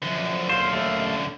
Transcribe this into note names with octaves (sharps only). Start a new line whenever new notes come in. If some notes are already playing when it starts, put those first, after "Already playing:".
F#2 D3 F3
D#2 C5 F5
A3